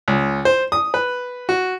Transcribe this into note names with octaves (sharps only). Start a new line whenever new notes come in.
C#2
C5
D#6
B4
F#4